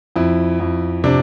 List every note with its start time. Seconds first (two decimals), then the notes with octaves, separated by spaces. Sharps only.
0.16 F2 E4
0.60 F2
1.04 C3 D4